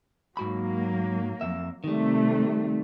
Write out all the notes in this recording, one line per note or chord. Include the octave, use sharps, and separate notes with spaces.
G#2 F#3 A#3 F#4 B5
F2 E5
C3 D#3 G3 A3